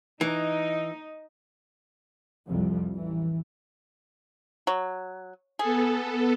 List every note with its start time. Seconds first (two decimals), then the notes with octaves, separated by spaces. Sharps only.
0.21 E3 D#4
2.48 C2 F2 C3 F3 G3
2.96 A1 E3
4.67 F#3
5.59 B3 G#4 A4